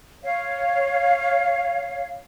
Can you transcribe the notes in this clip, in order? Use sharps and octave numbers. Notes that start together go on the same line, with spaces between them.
C#5 F5